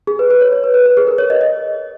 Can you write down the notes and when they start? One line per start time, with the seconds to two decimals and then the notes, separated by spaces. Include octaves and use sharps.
0.07 G#4
0.19 B4
0.30 B4
0.41 C#5
0.52 C#5
0.64 B4
0.74 B4
0.86 B4
0.97 G#4
1.07 A#4
1.18 C#5
1.30 D#5
1.41 D#5